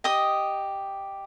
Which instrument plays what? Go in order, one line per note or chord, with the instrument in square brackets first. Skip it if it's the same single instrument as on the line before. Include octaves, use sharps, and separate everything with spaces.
[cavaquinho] G4 D#5 D#6